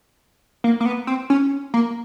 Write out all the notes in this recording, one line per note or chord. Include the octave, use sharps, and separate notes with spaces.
A#3
A#3
B3
C4
C#4
A#3